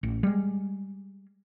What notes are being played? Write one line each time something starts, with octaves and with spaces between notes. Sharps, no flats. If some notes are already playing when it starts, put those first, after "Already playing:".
A1
G3 G#3